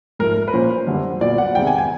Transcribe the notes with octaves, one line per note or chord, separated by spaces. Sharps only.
G#2 F3 A3 A#4
A#4
B4
A#2 F3 A#3 C#4 C5
F#2 D3 G3 B3
A#2 F#3 B3 D5
F#5
C3 D#3 G#3 B3 G5
G#5
G#5